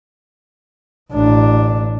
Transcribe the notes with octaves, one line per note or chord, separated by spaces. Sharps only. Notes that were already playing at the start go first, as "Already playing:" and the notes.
A1 D4